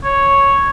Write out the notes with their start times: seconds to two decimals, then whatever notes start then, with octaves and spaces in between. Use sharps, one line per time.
0.04 C#5